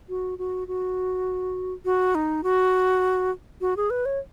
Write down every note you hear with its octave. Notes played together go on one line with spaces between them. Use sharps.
F#4
F#4
F#4
F#4
D#4
F#4
F#4
G#4
B4
C#5